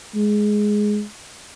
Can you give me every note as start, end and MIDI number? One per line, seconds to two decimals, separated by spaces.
0.15 1.03 56